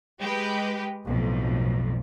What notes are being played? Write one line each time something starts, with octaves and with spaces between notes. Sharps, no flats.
G#3 G4 B4
B1 F2 A2